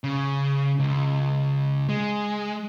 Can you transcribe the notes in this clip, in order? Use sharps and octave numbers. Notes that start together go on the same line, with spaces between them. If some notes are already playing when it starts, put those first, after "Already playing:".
C#3
C#2
G#3